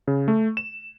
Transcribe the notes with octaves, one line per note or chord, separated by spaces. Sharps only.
C#3
A3
E7